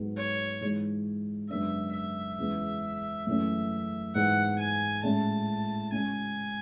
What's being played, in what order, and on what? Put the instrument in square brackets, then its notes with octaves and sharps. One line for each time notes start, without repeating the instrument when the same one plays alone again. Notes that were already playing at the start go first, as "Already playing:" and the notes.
Already playing: [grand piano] G#2 F#3 B3
[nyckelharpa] C#5
[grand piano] G#2 E3 G#3
[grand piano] F#2 C#3 G#3 B3 D4 [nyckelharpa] E5
[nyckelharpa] E5
[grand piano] E2 C#3 G#3 B3
F#2 C#3 E3 A3 C#4
[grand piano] G#2 E3 B3 E4 [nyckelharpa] F#5
[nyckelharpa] G#5
[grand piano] A2 G#3 C#4 E4 [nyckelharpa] A5
[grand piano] C#3 G#3 C#4 [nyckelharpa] G#5